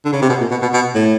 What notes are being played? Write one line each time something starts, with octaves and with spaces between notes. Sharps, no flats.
D3
C#3
C3
B2
A#2
B2
B2
B2
A2